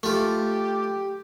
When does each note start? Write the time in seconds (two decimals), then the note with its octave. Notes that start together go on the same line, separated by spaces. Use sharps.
0.03 A3 F4 G4